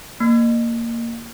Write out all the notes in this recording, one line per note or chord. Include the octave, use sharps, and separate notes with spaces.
A#3